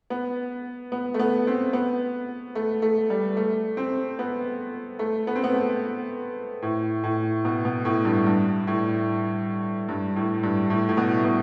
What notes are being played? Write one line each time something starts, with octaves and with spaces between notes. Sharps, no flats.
B3
B3
A3
B3
C4
B3
A3
A3
G3
A3
C4
B3
A3
B3
C4
B3
A3
A2
A2
B2
B2
A2
G2
G2
A2
G2
A2
G2
A2
A2
B2
B2